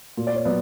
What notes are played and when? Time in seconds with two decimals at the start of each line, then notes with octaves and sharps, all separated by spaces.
0.17 A#2
0.27 D5
0.36 C#5
0.45 F#3 B3 D5